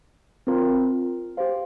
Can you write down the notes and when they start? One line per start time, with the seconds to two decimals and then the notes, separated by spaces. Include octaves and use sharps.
0.47 C4 F4 A#4
1.37 G4 C5 F5